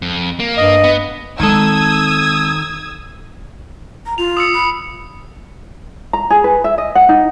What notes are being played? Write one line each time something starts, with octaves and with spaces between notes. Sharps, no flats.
F2
A#3
G2 D#5
B3
D#3 G#3 C4 A4 D#6 E6 G#6
A#5
F4 F7
D#6 E6 C#7
B5
A#5
G#4
B4
E5
D#5
F#5
D#4